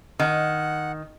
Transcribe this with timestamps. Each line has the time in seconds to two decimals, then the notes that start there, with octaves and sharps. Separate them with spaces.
0.19 D#3 F#5